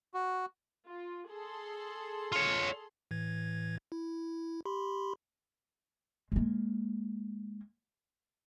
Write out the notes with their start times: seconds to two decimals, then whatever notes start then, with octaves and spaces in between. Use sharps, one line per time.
0.14 F#4
0.87 F4
1.31 G#4 A4 C6
2.32 F4 C#5
3.11 A2 E3 G#6
3.92 E4
4.65 G4 B5 C6
6.32 G#3 A#3